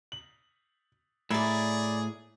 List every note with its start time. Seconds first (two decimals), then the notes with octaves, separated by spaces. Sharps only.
0.12 F#7
1.31 A2 G#4 D5 E5 A#5 B5 G#6